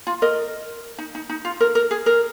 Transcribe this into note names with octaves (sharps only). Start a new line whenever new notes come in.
F4
A#4 D#5
D#4
D#4
D#4
F4
A#4
A#4
G#4
A#4